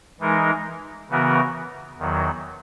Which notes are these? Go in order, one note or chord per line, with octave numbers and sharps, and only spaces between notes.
E3 G#3 D#4 A#4
C#3 E3 B3 F#4 A#4
E2 D#3 F#3